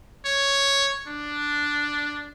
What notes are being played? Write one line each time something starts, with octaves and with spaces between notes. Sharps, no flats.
C#5
D4